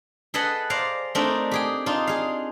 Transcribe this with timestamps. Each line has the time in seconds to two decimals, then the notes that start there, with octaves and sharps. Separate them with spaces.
0.34 G#4 A4 B4 D#5 F#5
0.70 C5 D5 F5 A#5
1.15 A3 C4 D4 D#4 A#4
1.51 G4 G#4 G5
1.86 D4 D#4 F4
2.07 G#4 F5